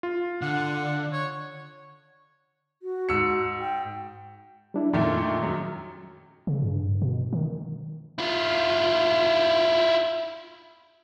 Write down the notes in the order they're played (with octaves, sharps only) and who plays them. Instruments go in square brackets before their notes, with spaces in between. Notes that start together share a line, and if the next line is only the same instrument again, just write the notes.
[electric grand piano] F4
[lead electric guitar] D3 [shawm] F#5
[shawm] C#5
[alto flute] F#4
[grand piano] G#2 E6 C#7
[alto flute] G5
[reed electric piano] G3 D4 E4
[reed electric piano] F2 [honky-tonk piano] A#2 D#3 A3
[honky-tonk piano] F#2 F#3
[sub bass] C#3
G2
B2
D#3
[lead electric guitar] E4 F4